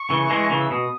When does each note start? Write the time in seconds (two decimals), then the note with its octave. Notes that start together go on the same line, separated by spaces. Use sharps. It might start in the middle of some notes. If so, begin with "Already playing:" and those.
Already playing: C#6
0.10 C#3 E3
0.30 E3 G#3
0.50 C#3 E3
0.60 E6
0.70 B2 D#6